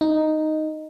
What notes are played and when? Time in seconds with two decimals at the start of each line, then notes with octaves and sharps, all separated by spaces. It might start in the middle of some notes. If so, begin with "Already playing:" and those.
0.01 D#4